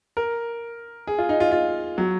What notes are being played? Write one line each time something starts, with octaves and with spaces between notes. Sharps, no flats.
A#4
G#4
F4
D#4
F4
F4
F#3